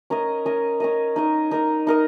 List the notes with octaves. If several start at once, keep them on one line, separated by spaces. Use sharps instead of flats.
C#4 A#4 D#5
C#4 A#4 D#5
C#4 A#4 D#5
D#4 A#4 D#5
D#4 A#4 D#5
D#4 A#4 D#5